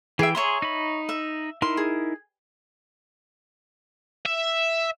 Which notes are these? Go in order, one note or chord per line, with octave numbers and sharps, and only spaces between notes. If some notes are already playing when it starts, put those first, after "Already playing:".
E3 G#4 E5 G5
G#4 C#5 E5 A#5 C6
D#4 B5
E5
D#4 E4 A#4 C6
G#4
E5